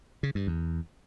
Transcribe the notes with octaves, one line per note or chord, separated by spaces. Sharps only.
C#3
G2
E2